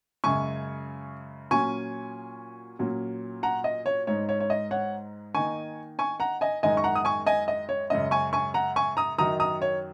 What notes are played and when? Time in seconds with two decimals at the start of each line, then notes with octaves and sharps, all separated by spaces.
0.24 F#2 C#3 G#3 G#5 C#6
1.51 A#2 F#3 C#4 G#5 C#6
2.79 A#2 F#3 C#4
3.43 F#5 A#5
3.64 D#5
3.86 C#5
4.07 G#2 G#3 D#4 C#5
4.29 C#5
4.40 C#5
4.50 D#5
4.71 C#5 F#5
5.35 D#3 A#3 D#4 G#5 C#6
5.99 G#5 C#6
6.20 F#5 A#5
6.41 D#5 G#5
6.63 F#2 D#3 G#3 D#4 D#5 G#5
6.77 C#6
6.84 F#5 A#5
6.96 D#6
7.05 G#5 C#6
7.26 D#5 G#5
7.48 D#5
7.69 C#5
7.90 F#2 C#3 G#3 C#4 D#5
8.11 G#5 C#6
8.33 G#5 C#6
8.54 F#5 A#5
8.76 G#5 C#6
8.97 A#5 D#6
9.18 F#2 D#3 F#3 D#4 A#5 D#6
9.40 A#5 D#6
9.62 C#5